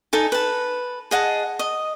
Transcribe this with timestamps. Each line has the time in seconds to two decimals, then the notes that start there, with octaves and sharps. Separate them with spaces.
0.13 D#4 A4 G#5
0.32 B4 A5
1.11 G#4 D#5 F#5 A5
1.59 D#5